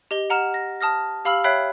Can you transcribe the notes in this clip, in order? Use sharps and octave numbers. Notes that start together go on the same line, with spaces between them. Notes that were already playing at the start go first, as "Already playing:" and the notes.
G4 D#5 G7
F#5 A#5 F6 E7
A#6
A5 D#6 F6 A#6
G4 F5 B5 E6 F6 F#7
C#5 E5 G5 B5 F#6 C7